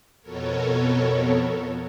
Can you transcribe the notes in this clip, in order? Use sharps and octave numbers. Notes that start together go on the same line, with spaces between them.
F2 B2 B3 A4 A#4 C#5